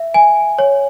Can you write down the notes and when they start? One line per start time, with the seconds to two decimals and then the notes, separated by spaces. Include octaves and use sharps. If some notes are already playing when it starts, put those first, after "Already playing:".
Already playing: E5
0.14 G#5
0.59 C#5